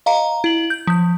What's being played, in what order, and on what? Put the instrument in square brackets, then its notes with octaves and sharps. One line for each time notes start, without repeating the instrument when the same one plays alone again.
[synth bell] D#5 F5 A#5
E4 F#7
G6
F3 G6